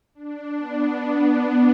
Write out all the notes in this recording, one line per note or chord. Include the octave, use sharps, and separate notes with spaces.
D4
B3